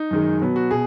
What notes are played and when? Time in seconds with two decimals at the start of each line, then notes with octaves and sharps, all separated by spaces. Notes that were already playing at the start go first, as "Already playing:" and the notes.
Already playing: D#4
0.11 F#2 D#3 G#3
0.41 B2 F#3 B3
0.56 F#4
0.71 B2 G#4